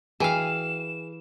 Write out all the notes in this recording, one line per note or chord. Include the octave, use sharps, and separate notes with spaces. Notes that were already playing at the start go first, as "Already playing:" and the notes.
E3 F#4 G#4 F5 G5 G#5 E7